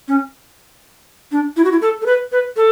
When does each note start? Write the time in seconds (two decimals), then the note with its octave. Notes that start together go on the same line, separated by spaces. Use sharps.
0.08 C#4
1.32 D4
1.57 E4
1.65 F#4
1.72 E4
1.82 A4
2.02 A4
2.06 B4
2.32 B4
2.57 A4